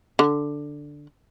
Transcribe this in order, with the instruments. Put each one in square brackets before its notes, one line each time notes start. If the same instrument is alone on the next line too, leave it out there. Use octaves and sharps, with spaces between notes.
[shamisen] D3